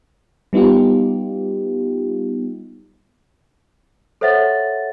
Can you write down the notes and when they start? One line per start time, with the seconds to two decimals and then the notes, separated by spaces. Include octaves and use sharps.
0.53 G3 B3 D#4 F4 G4
4.21 A4 C5 C#5 E5 F#5 A6